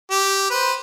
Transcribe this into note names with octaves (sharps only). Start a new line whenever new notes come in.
G4
B4 C5